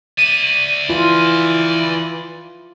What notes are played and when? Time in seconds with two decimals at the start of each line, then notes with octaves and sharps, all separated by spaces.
0.18 D5 E5 D#7
0.90 E3 F4